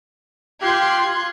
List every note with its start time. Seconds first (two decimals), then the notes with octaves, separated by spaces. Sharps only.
0.62 F4 G4 C6 F#6 G#6